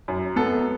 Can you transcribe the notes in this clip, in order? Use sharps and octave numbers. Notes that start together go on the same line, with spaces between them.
F#2
B3 A4